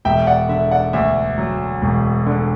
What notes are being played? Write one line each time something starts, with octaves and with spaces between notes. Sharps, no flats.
E1 E5 G5
D5 F#5
D3 E5
D5 F#5
D2 E5
F#3
E1
D3